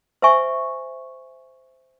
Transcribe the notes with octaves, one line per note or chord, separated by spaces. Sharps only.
C5 E5 G#5 C#6